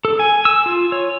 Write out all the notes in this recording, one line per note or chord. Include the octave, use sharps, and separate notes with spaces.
A4
G#5
E6
F4
C#5